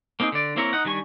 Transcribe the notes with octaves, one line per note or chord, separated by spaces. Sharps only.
A#3 C4 D#4 G#4
D3 D5
A#3 C4 E4 A#4 C#5
D#4 F#5
D#3 G3 D4 G#5 C#6